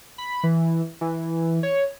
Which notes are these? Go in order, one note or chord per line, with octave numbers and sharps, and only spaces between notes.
B5
E3
E3
C#5